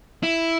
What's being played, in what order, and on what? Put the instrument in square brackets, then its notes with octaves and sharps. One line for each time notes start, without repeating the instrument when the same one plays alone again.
[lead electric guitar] E4